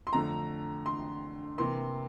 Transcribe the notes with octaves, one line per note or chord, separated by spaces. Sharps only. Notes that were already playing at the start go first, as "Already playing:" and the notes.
C6
F2 D3 A3 A#5
C6
C3 E3 A#3 C6